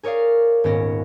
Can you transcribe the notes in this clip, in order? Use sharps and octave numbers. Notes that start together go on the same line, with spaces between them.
G#4 A#4 C#5 D5 F5
D#1 G#2 B3 C#4 A#6 D7